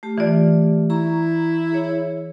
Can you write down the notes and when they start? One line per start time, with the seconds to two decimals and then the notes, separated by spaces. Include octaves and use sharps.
0.03 A3 G4
0.18 E3 F4 D5
0.90 E4 A#5 C#6
1.71 G#4 C#5